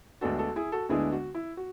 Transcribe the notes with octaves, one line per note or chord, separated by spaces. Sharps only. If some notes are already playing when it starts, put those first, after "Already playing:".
D2 D3 G#3 B3 D4 F#4 A4
F#4 A4
E4 G#4
F#4 A4
D2 D3 G#3 B3 D4 E4 G#4
F#4
E4
F#4